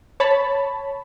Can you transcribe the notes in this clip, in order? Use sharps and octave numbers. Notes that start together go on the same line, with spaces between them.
C#5 A5 B5